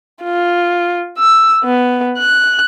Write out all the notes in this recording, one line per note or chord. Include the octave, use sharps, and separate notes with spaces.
F4
E6
B3
F#6